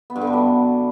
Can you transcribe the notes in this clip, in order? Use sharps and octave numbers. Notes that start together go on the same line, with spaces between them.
B3
G2
D3
G3
F#2